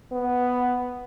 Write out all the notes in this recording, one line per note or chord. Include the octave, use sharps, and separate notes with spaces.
B3